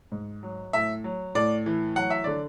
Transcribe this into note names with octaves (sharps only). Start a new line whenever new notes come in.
G#2
F#3
A2 E5
F#3
A2 D5
E3
F#3 F#5
E5
D3 D5